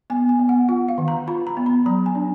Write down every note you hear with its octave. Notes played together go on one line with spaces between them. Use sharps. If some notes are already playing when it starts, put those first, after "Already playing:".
B3 G#5
G#5
B3
F#5
F4 F#5
F5
D#3
A#5
F4 B5
A#5
B3
B5
F#3 A#5
G#5
D4